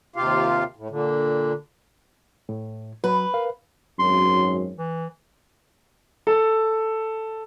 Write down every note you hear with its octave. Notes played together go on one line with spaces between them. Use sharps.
D#2 C3 F4 G4 F5
A2
A#2 D3
A2
F#3 B4
A#4 F5
G#1 F#2 C6
E3
A4